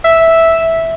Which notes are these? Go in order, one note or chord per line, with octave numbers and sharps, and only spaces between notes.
E5